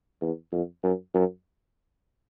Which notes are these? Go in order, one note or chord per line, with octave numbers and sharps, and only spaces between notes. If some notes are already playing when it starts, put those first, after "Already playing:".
E2
F2
F#2
F#2